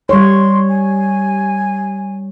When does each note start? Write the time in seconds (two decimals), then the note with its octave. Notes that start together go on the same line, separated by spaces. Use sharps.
0.09 G3 C#5 C6
0.69 G#5